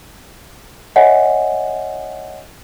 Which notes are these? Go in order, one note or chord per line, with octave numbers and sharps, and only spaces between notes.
C#5 D#5 E5 F#5 G#5